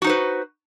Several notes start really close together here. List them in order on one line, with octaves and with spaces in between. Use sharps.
F#4 D#4 C5 B4